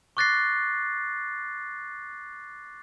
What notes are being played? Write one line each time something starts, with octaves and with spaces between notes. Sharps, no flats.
C#6 D6 F#6 A6 A#6 C7